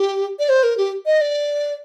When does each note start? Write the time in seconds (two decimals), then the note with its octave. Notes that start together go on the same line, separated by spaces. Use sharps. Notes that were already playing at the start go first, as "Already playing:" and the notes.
Already playing: G4
0.39 D5
0.49 C5
0.63 A#4
0.78 G4
1.06 D#5
1.21 D5